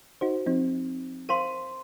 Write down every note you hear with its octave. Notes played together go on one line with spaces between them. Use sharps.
D#4 F#4 C5
F3 C4 D#4
A#4 C5 F5 C6 D#7